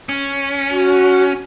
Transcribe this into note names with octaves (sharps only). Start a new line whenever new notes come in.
C#4
F#4